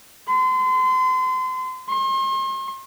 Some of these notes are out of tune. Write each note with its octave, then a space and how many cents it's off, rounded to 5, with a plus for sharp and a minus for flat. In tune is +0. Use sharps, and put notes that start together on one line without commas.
C6 -35
C6 +40